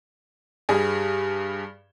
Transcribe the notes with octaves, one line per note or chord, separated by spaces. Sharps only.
G2 G3 G#4